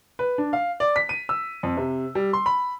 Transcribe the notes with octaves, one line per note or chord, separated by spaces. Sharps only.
B4
D4
F5
D5
B6
D#7
E6
F2
C3
G3
C6
B5